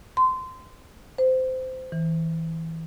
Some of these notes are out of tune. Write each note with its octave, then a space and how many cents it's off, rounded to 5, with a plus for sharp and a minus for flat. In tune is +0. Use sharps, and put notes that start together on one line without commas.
C6 -20
C5 -20
E3 -20